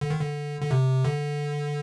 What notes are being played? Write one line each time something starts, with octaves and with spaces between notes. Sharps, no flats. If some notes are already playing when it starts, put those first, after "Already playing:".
D3
D#3
D3
D3
C3
D3